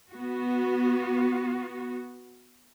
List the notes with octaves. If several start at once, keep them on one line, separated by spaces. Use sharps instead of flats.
B3 F#4